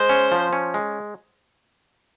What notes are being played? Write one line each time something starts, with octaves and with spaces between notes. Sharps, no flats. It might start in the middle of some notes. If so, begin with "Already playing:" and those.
Already playing: G#3 C5
C#4
F3
C#4
G#3